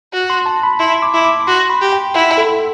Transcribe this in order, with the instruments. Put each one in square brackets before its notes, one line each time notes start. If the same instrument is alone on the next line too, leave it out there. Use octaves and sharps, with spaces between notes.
[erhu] F#4
[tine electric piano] C6
A5
B5
[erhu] E4 [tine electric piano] C6
[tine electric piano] D6
[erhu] E4
[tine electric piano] D6
[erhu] F#4 [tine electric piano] C6
[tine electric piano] B5
[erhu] G4
[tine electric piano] G5
[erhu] E4 [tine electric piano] F#5
[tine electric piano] A4